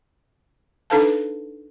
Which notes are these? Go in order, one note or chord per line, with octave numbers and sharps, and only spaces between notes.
D4 D#4 A4 B4 F5 A5